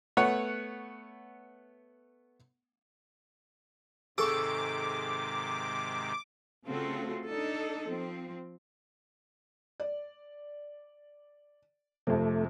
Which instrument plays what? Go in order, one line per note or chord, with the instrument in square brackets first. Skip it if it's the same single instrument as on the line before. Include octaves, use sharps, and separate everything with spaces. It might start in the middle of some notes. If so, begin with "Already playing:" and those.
[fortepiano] A3 B3 C#5 F#5
[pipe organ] G#2 C3 D#3 [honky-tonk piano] G#4 C#6 E6 [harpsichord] A4 [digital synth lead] D6
[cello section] C#3 A3 C4 F4 F#4 A4
D4 D#4 A4
F3 C4
[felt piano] D5
[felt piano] F2 C3 [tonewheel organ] A3